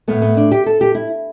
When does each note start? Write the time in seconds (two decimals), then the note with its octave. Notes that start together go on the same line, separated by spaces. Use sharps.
0.08 A2 A3 B3
0.22 B3
0.37 D4
0.51 G4
0.66 A4
0.81 G4
0.95 E4